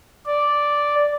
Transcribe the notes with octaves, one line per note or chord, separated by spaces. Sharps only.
D5